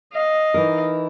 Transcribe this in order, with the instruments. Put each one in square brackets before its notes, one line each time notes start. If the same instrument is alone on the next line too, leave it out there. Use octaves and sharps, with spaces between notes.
[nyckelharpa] D#5 F5
[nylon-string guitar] E3 D#4 A#4